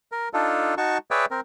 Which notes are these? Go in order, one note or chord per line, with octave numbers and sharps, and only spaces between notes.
A#4
D4 D#4 F4 A4
D#4 F#4 A5 C#6
G#4 B4 C#5 D5 E5 G5
C4 A#4